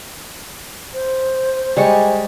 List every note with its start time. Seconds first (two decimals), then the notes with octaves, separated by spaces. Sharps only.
0.94 C5
1.77 G3 G#3 C#6